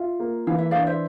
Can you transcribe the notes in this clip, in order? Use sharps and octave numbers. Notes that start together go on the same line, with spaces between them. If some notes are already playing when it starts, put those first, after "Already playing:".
Already playing: F4 E5
A#3
E3 F5
E5
D4 D5 F5
C5 E5